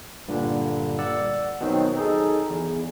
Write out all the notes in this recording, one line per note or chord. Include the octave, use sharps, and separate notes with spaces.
G2 A#2 D3
D5 F#5 E6
B2 D#3 F#3 C4
D#4 G#4 A4
E2